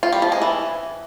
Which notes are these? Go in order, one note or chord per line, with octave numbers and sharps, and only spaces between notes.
F4
G3
F3
G#3
E3